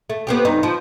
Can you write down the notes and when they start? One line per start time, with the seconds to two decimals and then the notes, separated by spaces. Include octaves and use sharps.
0.10 A3
0.27 B3 C4 G4
0.45 G2 D#4
0.63 F3